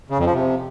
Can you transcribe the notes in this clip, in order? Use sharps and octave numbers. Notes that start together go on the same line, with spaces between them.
C#3
F2
F3
C3